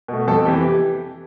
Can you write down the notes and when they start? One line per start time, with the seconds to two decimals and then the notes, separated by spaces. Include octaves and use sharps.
0.08 B2 A3
0.28 F2 A4
0.46 C3 E3 G4